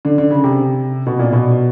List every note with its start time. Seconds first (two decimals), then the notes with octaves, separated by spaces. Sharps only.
0.05 D3
0.18 D3
0.31 C#3
0.44 C3
1.07 B2
1.19 A#2
1.32 B2